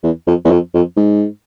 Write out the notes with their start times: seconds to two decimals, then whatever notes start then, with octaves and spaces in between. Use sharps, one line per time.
0.03 E2
0.27 F2
0.45 E2
0.51 F2
0.74 F2
0.97 G#2